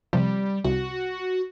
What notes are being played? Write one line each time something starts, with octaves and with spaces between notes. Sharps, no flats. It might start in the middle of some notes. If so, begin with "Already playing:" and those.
C3 F3 G3
C2 F#4